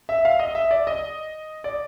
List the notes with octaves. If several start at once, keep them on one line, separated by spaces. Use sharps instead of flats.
E5
F5
D#5
E5
D5
D#5
D5